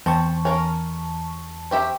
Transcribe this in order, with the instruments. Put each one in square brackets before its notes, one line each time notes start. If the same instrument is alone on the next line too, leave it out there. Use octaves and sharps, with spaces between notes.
[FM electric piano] E2 A5 C#6 [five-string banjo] C4
[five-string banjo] C#4 A#4
C4 G4 E5